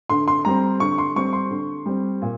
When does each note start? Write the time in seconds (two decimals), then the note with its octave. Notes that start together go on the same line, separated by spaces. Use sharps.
0.09 D3 C6
0.28 C6
0.45 G3 C4 A#5
0.80 D3 C#6
0.98 C6
1.16 G3 C4 C#6
1.33 C6
1.51 D3
1.86 G3 C4
2.22 A#2